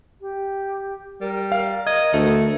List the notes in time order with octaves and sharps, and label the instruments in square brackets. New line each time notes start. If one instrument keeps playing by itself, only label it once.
[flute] G4
[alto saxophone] G3 [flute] A#4
[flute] A#4 [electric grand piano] F5
[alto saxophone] D#5 [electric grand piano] G#6
[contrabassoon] D2 [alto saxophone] A3